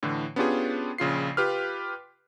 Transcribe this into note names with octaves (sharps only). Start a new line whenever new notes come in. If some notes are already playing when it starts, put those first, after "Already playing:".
A2 D3 E3
B3 C#4 D4 F4 G4 G#4
A#1 C#3 F4 C7
F4 G4 B4 F6